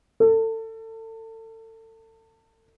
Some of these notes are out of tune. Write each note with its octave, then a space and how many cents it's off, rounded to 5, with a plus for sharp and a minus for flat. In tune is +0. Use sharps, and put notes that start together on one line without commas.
A4 +30